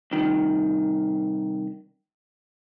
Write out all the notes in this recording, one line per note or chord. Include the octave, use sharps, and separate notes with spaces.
C2 D#3